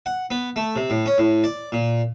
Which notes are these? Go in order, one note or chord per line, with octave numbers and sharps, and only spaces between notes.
F#5
B3
A3
C3
A2
C#4
A2
D5
A#2